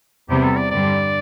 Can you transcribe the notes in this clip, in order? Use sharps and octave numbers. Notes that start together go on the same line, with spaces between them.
E2 C3 G3 B3 G4
A4
D5
G2 D3 G3 D5